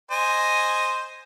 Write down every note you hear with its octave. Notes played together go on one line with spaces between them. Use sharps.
C5 D#5 G#5